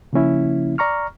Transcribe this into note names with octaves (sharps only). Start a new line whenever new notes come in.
C#3 F3 A#3 C#4 E4
D5 A#5 C#6 F6